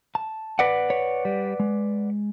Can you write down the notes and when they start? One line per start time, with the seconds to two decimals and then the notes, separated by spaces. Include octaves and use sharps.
0.15 A5
0.59 B4 D5 F#5
0.90 C#5
1.25 G3
1.60 G#3